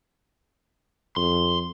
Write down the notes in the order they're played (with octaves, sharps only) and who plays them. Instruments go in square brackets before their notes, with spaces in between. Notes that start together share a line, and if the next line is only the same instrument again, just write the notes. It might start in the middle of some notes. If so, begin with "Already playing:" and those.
[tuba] F2 [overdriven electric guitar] C6